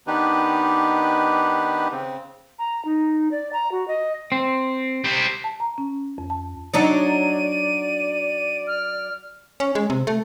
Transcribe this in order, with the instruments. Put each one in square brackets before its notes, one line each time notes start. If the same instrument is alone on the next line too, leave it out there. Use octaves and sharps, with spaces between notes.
[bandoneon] D#3 B3 D4 D#4 G4 B4
C#3 C4
[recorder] A#5
D#4
D5
A#5
F#4
D#5
[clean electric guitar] C4
[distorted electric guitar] G3 C5
[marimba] A5
A#5
C#4
F2
A5
[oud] F#3 D4 D#4 [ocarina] D5 [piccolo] D#7
[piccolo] F6
[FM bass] C#4
G#3
C3
A3